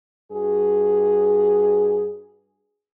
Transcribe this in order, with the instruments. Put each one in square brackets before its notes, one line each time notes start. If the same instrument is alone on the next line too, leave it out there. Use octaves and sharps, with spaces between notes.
[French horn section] G2 F#4 G#4